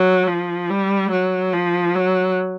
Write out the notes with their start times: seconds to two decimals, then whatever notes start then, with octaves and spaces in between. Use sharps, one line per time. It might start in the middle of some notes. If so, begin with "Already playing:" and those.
Already playing: F#3
0.27 F3
0.70 G3
1.11 F#3
1.53 F3
1.95 F#3